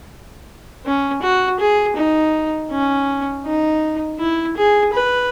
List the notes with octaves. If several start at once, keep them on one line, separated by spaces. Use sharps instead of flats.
C#4
F#4
G#4
D#4
C#4
D#4
E4
G#4
B4